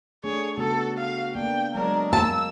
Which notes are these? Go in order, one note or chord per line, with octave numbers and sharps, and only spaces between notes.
A3 D4 G#4 C#5
C#3 A3 B3 F#4 A4
F5
A#3 B3 D4 G5
F#3 G#3 D4 A#4 C#5
A#3 A5 E6